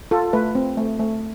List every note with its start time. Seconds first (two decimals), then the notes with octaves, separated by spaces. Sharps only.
0.11 F4 A4
0.33 A3 B4
0.55 C4
0.77 A3
0.99 A3